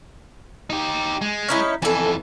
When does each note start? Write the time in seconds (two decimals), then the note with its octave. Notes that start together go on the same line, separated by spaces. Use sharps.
0.70 D#4 G4
1.21 G#3
1.48 C#4 D#4 E4
1.82 F2 E3 A4 G#5